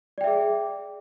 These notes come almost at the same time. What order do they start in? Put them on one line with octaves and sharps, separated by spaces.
D5 G5 E5 G#4